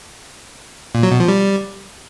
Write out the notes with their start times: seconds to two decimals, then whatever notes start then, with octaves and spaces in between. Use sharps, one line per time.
0.95 A#2
1.03 F#3
1.11 B2
1.20 F3
1.28 G3